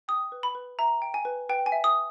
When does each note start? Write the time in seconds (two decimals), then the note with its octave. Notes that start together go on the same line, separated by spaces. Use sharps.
0.08 G5 D#6
0.32 B4
0.43 B5
0.55 B4
0.79 E5 A#5
1.02 G5
1.14 G#5
1.25 B4
1.49 B4 G5
1.66 G#5
1.72 E5
1.84 D#6